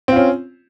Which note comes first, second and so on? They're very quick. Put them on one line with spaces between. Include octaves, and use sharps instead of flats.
C4 F4 C#4